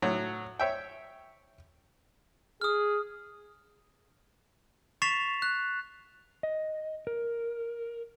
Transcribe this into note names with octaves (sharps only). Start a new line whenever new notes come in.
A2 F#3
C#5 E5 G5
G#4 D#6 F6
C#6 A6 B6 C7 E7 F7
F#6
D#5
A#4